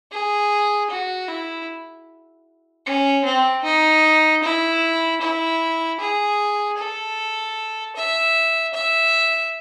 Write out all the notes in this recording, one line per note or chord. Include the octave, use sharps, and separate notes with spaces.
G#4
F#4
E4
C#4
C4
D#4
E4
E4
G#4
A4
E5
E5